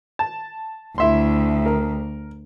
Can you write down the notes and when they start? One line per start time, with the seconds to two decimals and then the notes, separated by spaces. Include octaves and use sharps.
0.19 A5
0.98 D2 E4 E5 C6
1.66 A#4